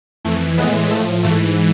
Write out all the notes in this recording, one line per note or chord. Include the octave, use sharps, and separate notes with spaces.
F2 E3 A3
A2 E3 G#3 B3
A2 F3 A3
G#2 E3 A3